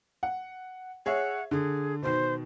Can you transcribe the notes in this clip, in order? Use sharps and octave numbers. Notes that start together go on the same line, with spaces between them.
F#5
G#4 C#5 E5 F#5
D3 G#4
B2 D#3 C5